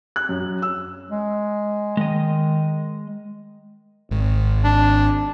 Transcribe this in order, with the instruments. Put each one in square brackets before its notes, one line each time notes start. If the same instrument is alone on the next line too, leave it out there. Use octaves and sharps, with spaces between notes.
[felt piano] F#6
F#2
E6
[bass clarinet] G#3
[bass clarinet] D#3 [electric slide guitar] G#3 D#5
[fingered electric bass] G#1
[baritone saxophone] D4